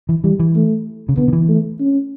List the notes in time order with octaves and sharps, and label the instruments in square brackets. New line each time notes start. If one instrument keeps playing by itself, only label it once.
[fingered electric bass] E3
[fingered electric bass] E3 [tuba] G3
[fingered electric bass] E3
[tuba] A3
[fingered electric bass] C#3
[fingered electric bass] D3 [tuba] B3
[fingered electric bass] D3
E3
[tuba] A3
C#4